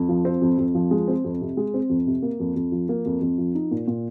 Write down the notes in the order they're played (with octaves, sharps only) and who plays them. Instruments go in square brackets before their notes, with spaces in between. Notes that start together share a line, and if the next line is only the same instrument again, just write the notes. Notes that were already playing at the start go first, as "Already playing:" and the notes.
Already playing: [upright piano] F2
F3
C4
F2
F2
F3
G#3
C4
F2
C3
G#3
C4
F2
C3
A#3
F2
F2
F3
A#3
F2
F2
F3
D#4
A#2
A#2